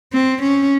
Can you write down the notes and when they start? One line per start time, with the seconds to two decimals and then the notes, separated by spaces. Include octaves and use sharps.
0.13 C4
0.42 C#4